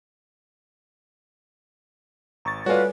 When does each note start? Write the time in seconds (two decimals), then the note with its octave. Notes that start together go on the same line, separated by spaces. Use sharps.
2.45 G#1 A#5 C#6 A6
2.66 G3 F4 F#4 A4 B4 C#5 D5 G#5